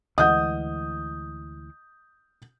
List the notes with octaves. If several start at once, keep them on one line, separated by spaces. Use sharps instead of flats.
D2 E3 G#3 D#5 F#5 D#6 G6